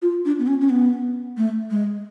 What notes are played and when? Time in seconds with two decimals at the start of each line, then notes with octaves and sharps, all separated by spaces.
0.02 F4
0.25 D4
0.39 B3
0.47 C#4
0.61 C#4
0.70 B3
1.37 A3
1.70 G#3